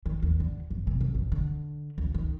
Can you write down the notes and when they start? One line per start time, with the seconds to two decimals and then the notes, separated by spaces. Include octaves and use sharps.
0.06 D#3
0.22 D#2
0.40 D3
0.71 F#1
0.87 C3
1.01 F2
1.14 A#1
1.32 D3
1.98 C#2
2.14 D#3